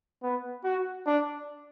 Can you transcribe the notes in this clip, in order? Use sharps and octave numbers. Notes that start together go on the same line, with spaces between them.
B3
F#4
D4